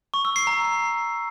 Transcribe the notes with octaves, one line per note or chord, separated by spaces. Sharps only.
C#6
E6
C7
A#5